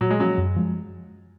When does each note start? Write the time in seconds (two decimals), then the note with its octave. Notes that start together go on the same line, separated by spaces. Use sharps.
0.01 A#2 F#3
0.10 G#3
0.20 F3 F#3 A#3 C#4
0.38 F#2
0.56 F3 G#3